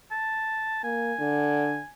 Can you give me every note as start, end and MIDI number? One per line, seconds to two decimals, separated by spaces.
0.11 0.83 81
0.84 1.13 58
0.84 1.91 80
1.19 1.80 50